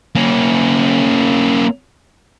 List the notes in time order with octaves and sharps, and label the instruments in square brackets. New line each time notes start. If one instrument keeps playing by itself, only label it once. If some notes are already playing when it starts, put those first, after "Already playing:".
[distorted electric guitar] A#3 C#4